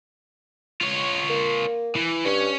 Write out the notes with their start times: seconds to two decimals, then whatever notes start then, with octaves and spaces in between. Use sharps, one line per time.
0.81 F4 C#5
1.30 A#3
1.95 E3
2.25 G2 C#4 C#5